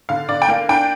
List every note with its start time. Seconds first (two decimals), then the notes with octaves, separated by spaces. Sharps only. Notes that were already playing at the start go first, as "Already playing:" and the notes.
0.09 D3 F5
0.29 D3 D5
0.42 G5
0.48 A#3 F5
0.69 D4 G5